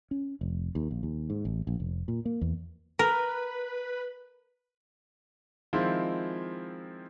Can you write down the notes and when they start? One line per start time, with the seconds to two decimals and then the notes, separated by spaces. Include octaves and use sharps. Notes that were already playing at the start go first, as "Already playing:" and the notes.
0.11 C#4
0.41 F1
0.75 D#2
0.91 A#1
1.03 D#2
1.30 G#2
1.45 A1
1.67 A#1
1.80 F1
2.08 A#2
2.25 A#3
2.41 E2
2.99 A#4 B4
5.73 D#3 F3 G#3 C4 E4 F4